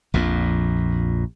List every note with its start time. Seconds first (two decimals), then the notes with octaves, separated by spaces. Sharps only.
0.14 A#1 F2 A#2